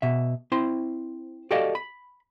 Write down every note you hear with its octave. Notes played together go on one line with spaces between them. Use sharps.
B2 E5
C4 E4 C5 C6
F#4 G4 A4 D5 D#5 F5
B5